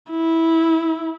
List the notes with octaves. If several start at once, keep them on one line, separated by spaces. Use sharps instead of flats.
E4